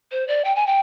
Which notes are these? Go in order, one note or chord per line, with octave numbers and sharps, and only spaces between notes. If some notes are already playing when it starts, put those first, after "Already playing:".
C5
D5
G5
G#5
G5